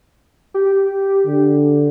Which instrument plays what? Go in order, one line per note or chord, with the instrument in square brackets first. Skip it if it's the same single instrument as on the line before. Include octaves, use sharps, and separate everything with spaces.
[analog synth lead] G4
[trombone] D3